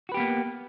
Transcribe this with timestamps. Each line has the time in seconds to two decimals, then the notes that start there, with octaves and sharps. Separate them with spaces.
0.09 F#4
0.12 B4
0.14 G4
0.17 B3
0.20 A#3